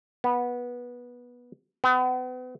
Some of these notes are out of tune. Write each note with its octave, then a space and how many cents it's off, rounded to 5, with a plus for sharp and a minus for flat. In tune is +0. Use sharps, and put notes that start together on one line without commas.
B3 -15
B3 +40